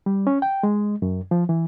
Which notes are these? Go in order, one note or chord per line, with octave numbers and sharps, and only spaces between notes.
G3
C#4
G5
G#3
F#2
F3
E3